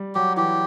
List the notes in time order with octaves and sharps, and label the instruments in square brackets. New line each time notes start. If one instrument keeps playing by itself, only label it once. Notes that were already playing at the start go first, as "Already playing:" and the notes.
Already playing: [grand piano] G3
[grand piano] F#3 [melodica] G4
[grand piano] E3 [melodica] G4